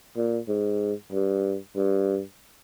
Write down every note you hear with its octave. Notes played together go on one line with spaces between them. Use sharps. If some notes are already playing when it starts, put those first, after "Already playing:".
A#2
G#2
G2
G2